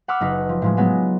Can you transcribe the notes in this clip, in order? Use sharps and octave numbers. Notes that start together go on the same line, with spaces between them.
F#5 B5 C#6 D6 E6 F6
F#1 D#4 B4
F3
A2 F3 G#3
F#3 G#3 B3 D#4